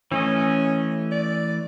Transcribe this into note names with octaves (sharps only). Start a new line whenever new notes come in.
E3 A3 C#4 D#5
D5